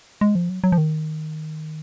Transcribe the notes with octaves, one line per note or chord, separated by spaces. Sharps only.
G#3
F3
F#3
F#3
F3
D#3